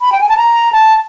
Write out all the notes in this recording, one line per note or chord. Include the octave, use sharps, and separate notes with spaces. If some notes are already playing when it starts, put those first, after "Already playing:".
B5
G5
G#5
A5
A#5
A5